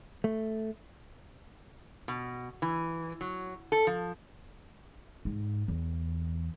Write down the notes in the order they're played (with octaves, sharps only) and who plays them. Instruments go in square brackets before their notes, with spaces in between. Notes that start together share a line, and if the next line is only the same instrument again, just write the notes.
[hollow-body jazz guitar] A3
[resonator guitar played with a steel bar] B2
E3
F#3
A4
F3
[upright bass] G#2
E2